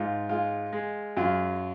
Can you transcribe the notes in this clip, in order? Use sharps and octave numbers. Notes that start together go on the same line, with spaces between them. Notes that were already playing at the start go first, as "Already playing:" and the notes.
Already playing: G#2 F4
G#3 F4
G#3
F#2 F4